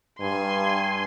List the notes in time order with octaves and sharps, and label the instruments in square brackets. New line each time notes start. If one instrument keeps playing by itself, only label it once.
[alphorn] G2 [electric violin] G#5 C6